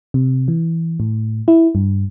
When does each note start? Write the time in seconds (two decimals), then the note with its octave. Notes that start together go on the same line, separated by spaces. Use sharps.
0.14 C3
0.48 E3
1.00 A2
1.48 E4
1.75 G2